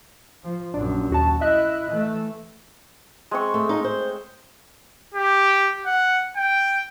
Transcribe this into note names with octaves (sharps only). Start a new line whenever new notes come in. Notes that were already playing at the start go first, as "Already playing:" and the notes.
F3
A#1 F#2 D4
D#2 F#4 A5
E4 D#5 E5 F#6
E3 A3
G#3 C4 C#6
A3
D#4 F4
C5
G4
F#5
G5